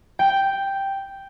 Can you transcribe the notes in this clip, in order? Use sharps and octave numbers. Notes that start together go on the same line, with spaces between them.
G5